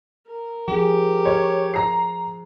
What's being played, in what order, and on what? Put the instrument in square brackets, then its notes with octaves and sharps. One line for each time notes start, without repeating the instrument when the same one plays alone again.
[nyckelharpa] A#4
[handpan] F3 G#4 [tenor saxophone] G4
[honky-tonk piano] C#5
A#5 C7